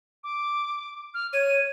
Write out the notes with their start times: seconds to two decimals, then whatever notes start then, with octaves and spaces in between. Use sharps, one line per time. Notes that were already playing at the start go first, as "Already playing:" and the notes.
0.24 D6
1.14 F6
1.33 C#5 D#7